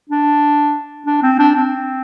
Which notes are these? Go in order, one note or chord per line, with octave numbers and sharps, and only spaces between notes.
D4
D4
C4
D4
C4